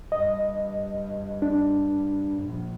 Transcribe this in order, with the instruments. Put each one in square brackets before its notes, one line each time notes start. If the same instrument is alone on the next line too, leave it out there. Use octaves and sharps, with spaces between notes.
[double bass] G2 [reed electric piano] D#5
[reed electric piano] D4
[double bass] A#1